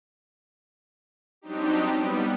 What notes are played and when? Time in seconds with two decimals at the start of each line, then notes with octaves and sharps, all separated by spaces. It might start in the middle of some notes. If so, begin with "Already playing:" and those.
1.42 F#3 G3 C4 D4 D#4 G4
1.90 G3 B3